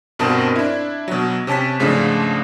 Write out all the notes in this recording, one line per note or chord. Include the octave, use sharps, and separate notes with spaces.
G2 B2 C4 A#4 A5
D4 E4
B2 F#3
C3 C#4 A5 A6 B6
G#2 C#3 F3 A3 D4